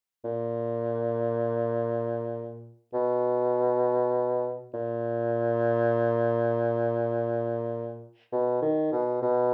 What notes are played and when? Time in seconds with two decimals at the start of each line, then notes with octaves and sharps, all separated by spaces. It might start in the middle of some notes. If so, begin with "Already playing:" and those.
0.25 A#2
2.94 B2
4.74 A#2
8.32 B2
8.62 D#3
8.92 B2
9.22 B2